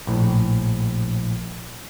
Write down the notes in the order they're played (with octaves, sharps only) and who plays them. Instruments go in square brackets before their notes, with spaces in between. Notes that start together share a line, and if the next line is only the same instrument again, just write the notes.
[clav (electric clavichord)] A#1 A2